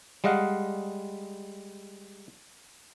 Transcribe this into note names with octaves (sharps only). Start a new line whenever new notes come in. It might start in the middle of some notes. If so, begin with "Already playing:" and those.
G3 G#3 D#5 F5 F#5